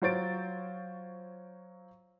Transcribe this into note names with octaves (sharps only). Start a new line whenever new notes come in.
F#3 F4 C5 C#5 A6 D7